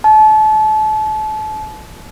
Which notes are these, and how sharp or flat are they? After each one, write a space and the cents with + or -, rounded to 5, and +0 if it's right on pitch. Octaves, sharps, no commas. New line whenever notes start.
A5 -35